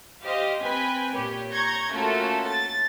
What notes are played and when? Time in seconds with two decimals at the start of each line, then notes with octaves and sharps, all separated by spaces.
0.23 G4 C5 D#5 F5
0.61 C4 B4 G5 G#5 B5
1.14 A#2 G4 C#5
1.51 A#5 C#6 G6 G#6 A#6
1.92 A3 A#3 C#4 F4 F#4 A4
2.46 A6